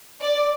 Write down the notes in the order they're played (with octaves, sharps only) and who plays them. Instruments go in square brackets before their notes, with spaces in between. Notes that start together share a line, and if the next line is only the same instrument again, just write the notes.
[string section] D5